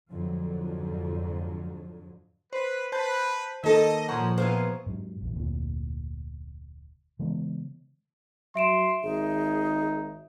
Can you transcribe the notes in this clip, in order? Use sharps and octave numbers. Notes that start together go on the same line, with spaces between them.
F2 G#2 D3 F3 F#3
B4 C5
B4 C5 A5 G6
D#3 A#3 A4 D#5
A#2 F3 G#3 C#4 C5 F#5 A#5 C#6
B3 E4 G#4 C5 F5
G#2 F#3
A#1 E2
F1 D2 A#2
C#3 E3 G#3 B3
F#3 E5 C6 D7 E7
G#1 D#4 G#4